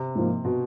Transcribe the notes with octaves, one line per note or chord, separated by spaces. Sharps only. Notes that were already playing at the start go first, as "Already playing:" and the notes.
Already playing: C3
G#2 F3 A#3
B2